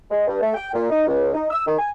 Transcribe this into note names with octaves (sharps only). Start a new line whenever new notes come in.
G#3
G2
A3
G5
A#2
D#4
C#2
D#4
E6
D#3
G#5